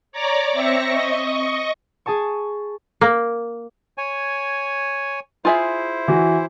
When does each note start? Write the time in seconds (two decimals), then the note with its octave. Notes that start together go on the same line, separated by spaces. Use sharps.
0.12 C#5 D5 A#5 D6
0.53 C4 E5 A#6 C#7
0.89 D#5 C#6
2.06 G#4 G#5 A5 C#6
3.01 A#3
3.98 C#5 G#5
5.45 E4 F4 G#4 C5 E5
6.08 E3 F#4